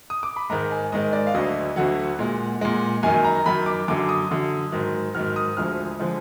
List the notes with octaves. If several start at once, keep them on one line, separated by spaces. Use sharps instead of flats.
D#6
D6
B5
G#2 D#3 G#3 A#5
G#5
G#2 D#3 G#3 D#5
D5
F5
D2 D3 F#3 D#5
D2 D3 F#3 F#5
A#2 G#3
A#2 G#3
F#2 D#3 F#3 G#5
A#5
F#2 D#3 F#3 B5
D6
F#2 D3 F#3 D6
D#6
F#2 D3 F#3
G#2 D#3 F#3
G#2 D#3 F#3 F6
F6
D#6
D2 D3 F3 G#3 F6
D3 F3 G#3